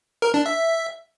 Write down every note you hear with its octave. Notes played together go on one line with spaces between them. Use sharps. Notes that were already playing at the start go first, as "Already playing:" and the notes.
A#4
D4
E5